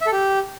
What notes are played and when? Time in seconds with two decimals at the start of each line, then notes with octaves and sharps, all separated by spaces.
0.01 E5
0.06 A4
0.12 G4